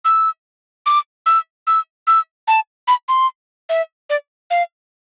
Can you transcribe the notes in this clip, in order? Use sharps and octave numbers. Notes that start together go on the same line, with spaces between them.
E6
D6
E6
E6
E6
A5
B5
C6
E5
D5
F5